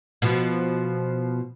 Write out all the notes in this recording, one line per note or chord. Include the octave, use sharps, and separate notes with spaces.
B2 F3